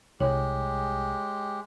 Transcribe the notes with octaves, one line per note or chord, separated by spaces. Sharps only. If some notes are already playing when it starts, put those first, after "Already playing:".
C2 G#3 G4 C#5